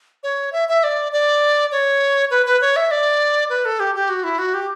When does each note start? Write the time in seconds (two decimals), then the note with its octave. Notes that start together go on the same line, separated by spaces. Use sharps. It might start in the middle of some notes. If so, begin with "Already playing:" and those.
0.23 C#5
0.53 E5
0.69 E5
0.84 D5
1.12 D5
1.72 C#5
2.31 B4
2.46 B4
2.61 C#5
2.76 E5
2.91 D5
3.50 B4
3.65 A4
3.80 G4
3.95 G4
4.09 F#4
4.24 E4
4.39 F#4
4.54 G4